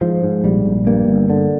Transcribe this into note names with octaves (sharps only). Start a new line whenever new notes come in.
G#2 F3
G#2
A#1 G3
A#1
G2 A#3
G1
D3